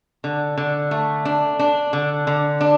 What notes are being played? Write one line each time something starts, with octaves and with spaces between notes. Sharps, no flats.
D3
D3
A3
D4
D4
D3
D3
D4